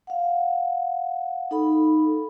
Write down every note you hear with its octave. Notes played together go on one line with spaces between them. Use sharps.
F5 F#5
D#4 A4 B5